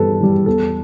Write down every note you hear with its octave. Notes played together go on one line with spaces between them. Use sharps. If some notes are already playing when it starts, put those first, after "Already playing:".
Already playing: G2 E3 G3 A4 B4
E3 G3
E2 A4